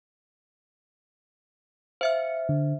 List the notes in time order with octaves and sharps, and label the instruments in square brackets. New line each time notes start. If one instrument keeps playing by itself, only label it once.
[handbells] C5 E5 F6 [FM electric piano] F5 C#7
[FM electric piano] D3